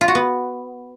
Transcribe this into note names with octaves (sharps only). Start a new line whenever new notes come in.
F4
F#4
B3